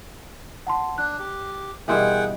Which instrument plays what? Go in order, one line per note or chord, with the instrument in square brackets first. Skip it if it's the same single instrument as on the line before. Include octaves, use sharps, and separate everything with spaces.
[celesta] F#5 A5 C6
[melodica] D4 [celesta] F#6
[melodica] G4
[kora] G2 B2 E3 [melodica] G#4 F#5 G5 [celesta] A#4 C6